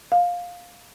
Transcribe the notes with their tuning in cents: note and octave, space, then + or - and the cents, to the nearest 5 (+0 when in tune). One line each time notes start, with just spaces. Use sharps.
F5 +15